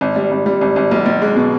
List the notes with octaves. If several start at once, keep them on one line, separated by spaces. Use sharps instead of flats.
G#1
G3
G#1
G3
G#1
G#1
B1
B1
G#3
B2